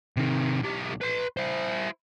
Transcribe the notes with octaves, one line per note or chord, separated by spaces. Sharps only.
C3 D#3
B1 G4
B4 C6
E4 C5